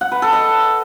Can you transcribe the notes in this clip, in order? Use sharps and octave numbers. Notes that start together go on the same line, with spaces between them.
F#5
B4
A4
D#5